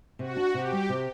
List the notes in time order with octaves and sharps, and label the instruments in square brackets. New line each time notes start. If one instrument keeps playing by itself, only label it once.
[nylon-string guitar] C3 [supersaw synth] F#4
[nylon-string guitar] D4
[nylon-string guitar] C3 [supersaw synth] G4
[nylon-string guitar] G3
C3